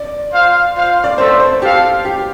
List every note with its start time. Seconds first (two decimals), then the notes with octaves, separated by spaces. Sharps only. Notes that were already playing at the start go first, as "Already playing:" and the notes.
Already playing: D5
0.31 F4 C5 F5
0.74 F4 C5 F5
1.04 D5
1.17 A3 C4 A4 C5 D5
1.40 C5
1.62 C4 G4 A4 F5
2.05 G4